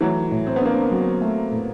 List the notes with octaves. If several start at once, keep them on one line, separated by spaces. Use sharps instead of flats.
E3 F#3 A3
A2
C4
B3
A#3 C4 D4
F#3
A3
A2